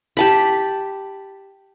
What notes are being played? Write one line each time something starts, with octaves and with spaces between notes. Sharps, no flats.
G4 A5 B5